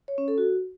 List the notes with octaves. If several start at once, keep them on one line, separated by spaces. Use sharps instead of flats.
C#5
C#4
A4
F#4